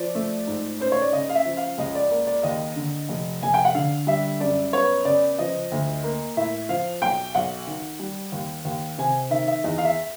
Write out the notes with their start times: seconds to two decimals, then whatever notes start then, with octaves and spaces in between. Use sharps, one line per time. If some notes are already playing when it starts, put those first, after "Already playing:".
Already playing: F3 D5
0.15 A3
0.47 G#2
0.80 C#4 C5
0.92 C#5
1.02 D5
1.12 C#3 D#5
1.29 F5
1.35 E5
1.45 F3
1.57 F5
1.78 C#2 D#5
1.95 D5
2.11 A#3 D5
2.27 D5
2.43 D#2 D#5
2.76 D3
3.09 F1
3.42 F1 G#5
3.54 G5
3.65 F#5
3.75 D3 F5
4.07 G3 E5
4.40 F#2 D5
4.73 B3 C#5
5.05 C#3 D5
5.39 F3 D#5
5.72 D2
6.04 A#3
6.37 A2 E5
6.69 F3 F5
7.01 B1 G5
7.35 B1 F#5
7.67 D#3
7.99 G3
8.32 D#2
8.65 D#2
8.98 C3 G#5
9.31 D#3 E5
9.48 E5
9.64 E2 D#5
9.78 F5
9.85 E5